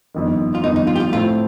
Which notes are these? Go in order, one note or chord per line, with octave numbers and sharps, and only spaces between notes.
G1 F2 D#3
F4
G1 F2 D#3 D#4
D#4
F4
G4
F4
A2 A3 C4 F4